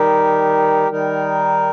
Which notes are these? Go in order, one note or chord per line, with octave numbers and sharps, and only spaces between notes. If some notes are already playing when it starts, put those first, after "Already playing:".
Already playing: D#3 G3 D#4 G4 A#4
D#3 G3 D#4 A#4